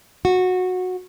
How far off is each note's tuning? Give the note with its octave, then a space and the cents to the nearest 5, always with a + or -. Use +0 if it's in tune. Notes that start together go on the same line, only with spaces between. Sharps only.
F#4 -15